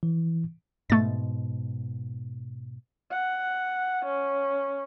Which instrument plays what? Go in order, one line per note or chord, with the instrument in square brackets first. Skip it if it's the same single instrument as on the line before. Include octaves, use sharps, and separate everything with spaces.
[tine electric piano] E3
[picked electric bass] G#2 B2 [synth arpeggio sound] A3 A6
[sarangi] F#5
C#4